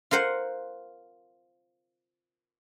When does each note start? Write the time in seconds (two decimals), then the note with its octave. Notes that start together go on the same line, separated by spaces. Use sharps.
0.11 F4 A#4 C5 F#5